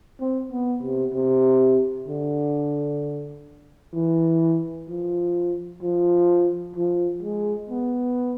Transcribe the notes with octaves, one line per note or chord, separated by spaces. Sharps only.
C4
B3
C3
C3
D3
E3
F3
F3
F3
G#3
B3